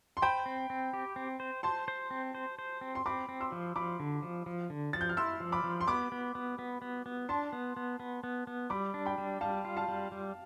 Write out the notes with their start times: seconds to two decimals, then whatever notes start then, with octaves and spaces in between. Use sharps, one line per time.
0.17 C6
0.22 C5 G5 B5
0.46 C4
0.70 C4
0.94 G4
1.16 C4
1.40 C5
1.63 C5 A5 C6
1.88 C5
2.11 C4
2.35 C5
2.59 C5
2.81 C4
2.95 C6
3.06 C4 B5 D6
3.29 C4
3.40 C6 E6
3.52 F3
3.76 F3 B5 D6
4.00 D3
4.23 F3
4.46 F3
4.70 D3
4.93 F3 A6
5.01 G6
5.09 F6
5.17 E4 C6 E6
5.40 F3
5.52 B5 D6
5.64 F3
5.81 C6
5.87 B3 B5 D6
6.12 B3
6.35 B3
6.59 B3
6.82 B3
7.06 B3
7.29 D4 A5 C6
7.53 B3
7.77 B3
8.00 B3
8.24 B3
8.47 B3
8.70 G3 B5 D6
8.94 D4
9.06 G5 B5
9.18 G3
9.41 G3 F5 A5
9.65 F4
9.77 F5 A5
9.88 G3
10.12 G3